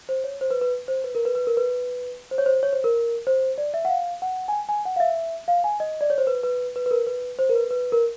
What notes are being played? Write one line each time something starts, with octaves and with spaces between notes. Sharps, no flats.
C5
C#5
C5
B4
B4
C5
B4
A#4
B4
B4
A#4
B4
C5
C#5
C5
C#5
C5
A#4
C5
D5
E5
F#5
F5
F#5
G#5
G5
G#5
F#5
F5
E5
F5
G#5
D#5
D5
C#5
C5
B4
B4
B4
B4
A#4
B4
C5
A#4
B4
B4
A#4